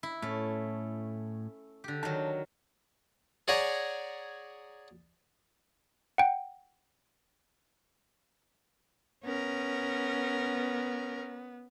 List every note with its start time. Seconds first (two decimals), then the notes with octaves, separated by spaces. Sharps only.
0.03 E4
0.22 A2 A3 C#4
1.84 D3 G4
2.03 D#3 F#3 A5
3.48 G#4 C#5 D5 F#5 G#5 A#5
6.18 F#5 G5
9.25 B3 C#4 A#4